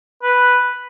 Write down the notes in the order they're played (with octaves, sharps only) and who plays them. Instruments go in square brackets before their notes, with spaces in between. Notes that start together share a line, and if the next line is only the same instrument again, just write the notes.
[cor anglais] B4